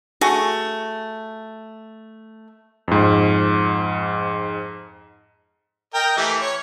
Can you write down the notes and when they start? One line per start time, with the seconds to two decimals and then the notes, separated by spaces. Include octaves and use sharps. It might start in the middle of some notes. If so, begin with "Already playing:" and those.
0.21 A3 F#4 G#4
2.88 F2 G#2
5.94 A#4 D#5 G5
6.17 E3 A3 G4
6.41 C#5